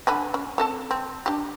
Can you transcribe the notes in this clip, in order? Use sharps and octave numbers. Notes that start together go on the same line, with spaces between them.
D3 B4 G#5
C#4
C4 A4 A5
C4
D4 G4